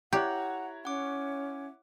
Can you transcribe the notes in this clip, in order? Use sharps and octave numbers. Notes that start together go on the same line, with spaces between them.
E4 G4 C#5 F#5 A#5 F#6
C#4 F#5 D6